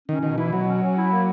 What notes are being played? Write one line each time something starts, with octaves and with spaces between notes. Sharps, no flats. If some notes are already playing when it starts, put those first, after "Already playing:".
D#3 C#4
B2 D#3
E3 E4
B2 F#3
C#4
C#4
E4
A#3